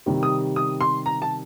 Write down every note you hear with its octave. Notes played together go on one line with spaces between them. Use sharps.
C3 D#3 G3
D#6
D#6
C6
A#5
A5